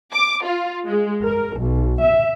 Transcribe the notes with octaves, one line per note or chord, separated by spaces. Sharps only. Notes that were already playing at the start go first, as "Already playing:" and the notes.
D6
F4
G#3
A#4
B1
E5